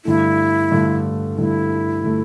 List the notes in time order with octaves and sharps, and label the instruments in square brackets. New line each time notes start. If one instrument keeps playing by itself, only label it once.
[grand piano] G2 D3 A3 [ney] E4
[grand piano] G2 D3 A3
[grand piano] G2 D3 A3 [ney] E4
[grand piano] D3 A3